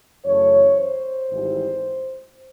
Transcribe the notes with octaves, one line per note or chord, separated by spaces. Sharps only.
F#2 C#3 E3 A3 C#5
C5
G#1 G#2 E3 G3